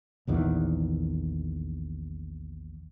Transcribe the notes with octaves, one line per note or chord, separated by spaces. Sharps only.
A#1 E2 D#3 E3